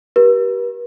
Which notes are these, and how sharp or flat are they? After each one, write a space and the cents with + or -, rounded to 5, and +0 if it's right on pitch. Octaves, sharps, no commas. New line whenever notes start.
G4 -25 B4 -45